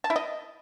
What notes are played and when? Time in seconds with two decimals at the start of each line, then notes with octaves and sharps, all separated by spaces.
0.04 A5
0.10 E4
0.16 D#5